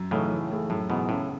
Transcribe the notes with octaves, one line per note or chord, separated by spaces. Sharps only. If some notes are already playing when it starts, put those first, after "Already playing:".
Already playing: F#2
A2 C#3 E3 A3 D#4
E3
A3 E4 G#4
F#2 A2
G#2 B2 E3 B3
A2 C#3